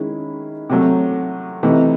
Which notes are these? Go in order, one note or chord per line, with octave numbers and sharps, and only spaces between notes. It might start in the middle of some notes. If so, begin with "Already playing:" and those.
Already playing: D#3 G#3 C#4 E4
C3 F#3 A3
C3 E3 A3 D#4